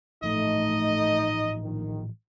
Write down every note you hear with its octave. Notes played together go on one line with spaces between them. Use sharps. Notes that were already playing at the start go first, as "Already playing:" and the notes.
A2 E3 F3 A3 D#4 D#5
A#1 D#3